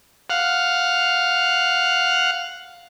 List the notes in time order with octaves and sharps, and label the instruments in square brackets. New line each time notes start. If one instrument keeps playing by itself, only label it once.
[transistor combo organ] F5 F#5